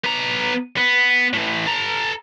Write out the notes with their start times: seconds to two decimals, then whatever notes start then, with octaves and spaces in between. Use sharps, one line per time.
0.04 B3 A#5
0.78 B3
1.34 A2 E3
1.66 A4 A#5